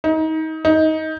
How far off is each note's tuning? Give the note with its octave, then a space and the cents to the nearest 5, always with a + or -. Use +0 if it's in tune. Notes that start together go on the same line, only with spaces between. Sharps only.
D#4 +30
D#4 +20